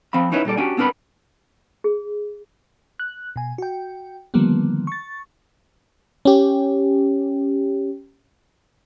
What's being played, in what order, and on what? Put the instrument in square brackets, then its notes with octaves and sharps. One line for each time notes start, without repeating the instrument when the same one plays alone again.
[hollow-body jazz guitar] F3 C4 F5 B5
C#4 D#4 E4 B4 C#5
A#2 G3 A4 D5
C#4 D4 F#4 G4 G5 G#5
B3 C4 D4 A#4 B4 B5
[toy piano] G#4
[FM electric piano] F#6
B2 G#5
F#4 G5
D3 D#3 F3 G3 A#3 B3
C#6 A6
C#4 G4